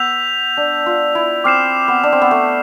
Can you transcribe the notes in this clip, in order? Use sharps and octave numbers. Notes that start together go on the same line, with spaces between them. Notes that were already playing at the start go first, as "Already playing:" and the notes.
Already playing: B3 E6 G6 B6 F7
D4
F4
E4
C4 D6 F6 C7 E7
B3
D4
C4
B3
A3